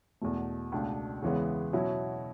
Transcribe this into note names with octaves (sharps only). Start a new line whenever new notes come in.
E2 B2 A3
C#2 B2 A3 D4
E2 C#3 E3 G#3 B3
B2 F#3 C#4 E4